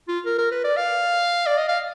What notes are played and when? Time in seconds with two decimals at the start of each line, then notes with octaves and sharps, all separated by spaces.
0.08 F4
0.26 A#4
0.38 A#4
0.51 B4
0.64 D5
0.77 F5
1.46 D5
1.57 D#5
1.69 F5